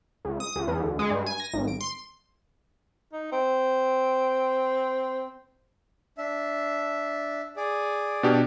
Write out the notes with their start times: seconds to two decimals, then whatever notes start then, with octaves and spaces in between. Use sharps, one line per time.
0.25 C#2
0.40 D#6
0.56 C#2
0.68 E2
0.83 D2
0.99 G#3
1.10 G2
1.26 G#5
1.40 A#6
1.54 G#1
1.68 D7
1.81 C6
3.13 D#4
3.32 C4
6.18 D4 E5
7.57 G#4 D5
8.23 B2 D4 G4